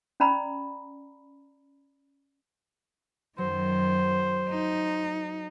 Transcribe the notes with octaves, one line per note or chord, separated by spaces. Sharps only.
C#4 D5 A#5 B5
F#2 D#3 F#3 C5
D#4